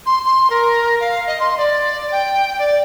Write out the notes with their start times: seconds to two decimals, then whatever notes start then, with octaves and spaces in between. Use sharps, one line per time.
0.06 C6
0.25 C6
0.50 A#4
1.00 F5
1.27 D#5
1.40 C6
1.57 D5
2.12 G5
2.59 D5